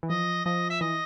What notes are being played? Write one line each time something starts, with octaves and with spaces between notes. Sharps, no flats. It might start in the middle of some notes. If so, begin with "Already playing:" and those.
E3
F3 D#5
F3 D#5
E5
E3 D#5